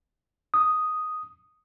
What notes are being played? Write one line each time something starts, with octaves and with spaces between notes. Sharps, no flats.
D#6